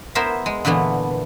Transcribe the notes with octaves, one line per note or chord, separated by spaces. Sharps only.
B3 E4 A#4 C5 E5
G#3
A#2 D3 E3 A3 B3